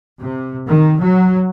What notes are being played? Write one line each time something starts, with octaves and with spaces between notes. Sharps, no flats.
C3
D#3
F#3